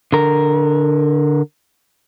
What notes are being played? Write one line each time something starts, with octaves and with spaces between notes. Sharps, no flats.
D3 A#4